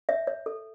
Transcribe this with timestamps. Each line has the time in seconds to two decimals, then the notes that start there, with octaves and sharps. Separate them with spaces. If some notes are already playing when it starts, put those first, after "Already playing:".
0.09 C#5 E5
0.27 C#5
0.46 A4